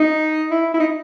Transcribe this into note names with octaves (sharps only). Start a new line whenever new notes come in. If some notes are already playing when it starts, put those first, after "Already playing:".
Already playing: D#4
E4
E4
D#4